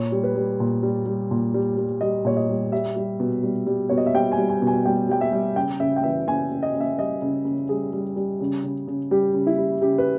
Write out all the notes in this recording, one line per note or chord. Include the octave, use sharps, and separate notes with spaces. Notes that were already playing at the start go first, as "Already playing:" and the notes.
Already playing: A#2 C#5
G3
B4
G3
A#2
G3
G3
A#2
G3
G3
G3 D#5
A#2 C#5
D#5
G3
G3 E5
G3
B2
G3
G3
B2 C#5
D#5
E5
G3 G5
G#5
G3
G#5
B2
G#5
G3 G5
G3 G5
E5
G3
C#3 G5
C#3 E5
G5
E3 E5
C#3 G#5
C#3
D#5
C#3
E5
G3 D#5
C#3
C#3
G3 G#4
G3
G3
C#3
C#3
C#3
G3 G4
C#3
E4
G3
C#3 G4
B4